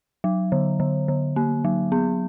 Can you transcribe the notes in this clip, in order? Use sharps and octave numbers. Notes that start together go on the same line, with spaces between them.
F#3
D3
D3
D3
A#3
F#3
B3